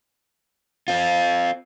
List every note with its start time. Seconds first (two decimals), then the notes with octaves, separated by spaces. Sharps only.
0.88 C4 F4